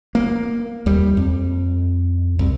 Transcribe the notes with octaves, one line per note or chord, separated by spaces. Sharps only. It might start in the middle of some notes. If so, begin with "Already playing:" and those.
A#3
D#2 G3
F2
C2